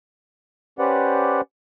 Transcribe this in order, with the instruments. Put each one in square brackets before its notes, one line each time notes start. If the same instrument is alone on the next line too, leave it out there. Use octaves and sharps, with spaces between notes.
[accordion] C#4 G4 B4 C5 D5 F#5